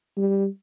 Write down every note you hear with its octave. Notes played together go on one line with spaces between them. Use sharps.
G3